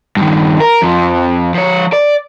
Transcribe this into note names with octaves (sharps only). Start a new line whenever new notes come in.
G2 D#3
A#4
F2 F3
F3 C#5
D5